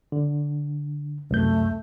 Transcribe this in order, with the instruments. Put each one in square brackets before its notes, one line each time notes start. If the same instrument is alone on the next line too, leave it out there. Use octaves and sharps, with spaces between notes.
[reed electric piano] D3
[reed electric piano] C2 F#2 G6 [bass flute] A3